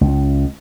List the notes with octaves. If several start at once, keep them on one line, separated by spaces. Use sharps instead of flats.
C#2